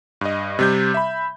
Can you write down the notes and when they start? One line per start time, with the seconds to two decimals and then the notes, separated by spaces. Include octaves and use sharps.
0.21 G2 D#5
0.59 C3 G3 G6
0.94 E5 B5